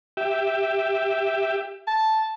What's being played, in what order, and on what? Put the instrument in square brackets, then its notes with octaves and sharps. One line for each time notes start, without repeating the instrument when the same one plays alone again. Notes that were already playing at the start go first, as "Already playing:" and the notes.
[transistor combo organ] G4 E5
[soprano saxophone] A5